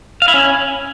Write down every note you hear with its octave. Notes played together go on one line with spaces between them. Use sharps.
F5
E4
C#4